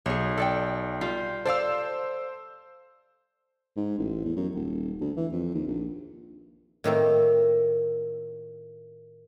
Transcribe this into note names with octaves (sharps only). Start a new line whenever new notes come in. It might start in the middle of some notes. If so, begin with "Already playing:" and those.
B1 G#4 C#5
A4 D5 G5
G3 F4
A4 C5 D5 F5 E6
G#2
A1
E2
F#2
D#1
D2
E3
F2
D#2
A#1
A2 D#3 A#3 C4